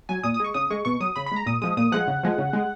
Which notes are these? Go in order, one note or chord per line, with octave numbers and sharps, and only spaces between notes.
F#3 G#5
A#2 D#6
D#6
G#3 C#6
C#3 D#6
G#3 C#6
B2 C#6
F#3 D#6
C#3 B5
B5
G#3 A#5
A#2 D#6
F3 G#3 D#6
A#2 D#6
F3 G#3 F#5
C#3
F3 G#3
C#3
G#3